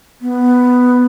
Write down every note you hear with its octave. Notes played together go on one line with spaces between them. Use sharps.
B3